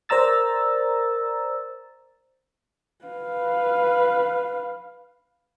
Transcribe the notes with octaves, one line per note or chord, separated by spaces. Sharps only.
A#4 C5 D5 A#5 E6 A6
B4 F5